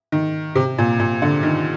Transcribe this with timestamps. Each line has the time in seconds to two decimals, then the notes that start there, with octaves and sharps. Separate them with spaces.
0.12 D#3
0.56 C3
0.78 A#2
1.00 A#2
1.22 D3
1.43 D#3